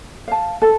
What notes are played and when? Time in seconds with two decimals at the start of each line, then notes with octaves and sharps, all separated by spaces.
0.28 F5 A5
0.62 A4